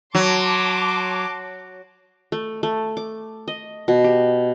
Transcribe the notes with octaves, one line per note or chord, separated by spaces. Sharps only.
F#3 A5 C6 D6
A3
A3
D6
D#5
B2
G4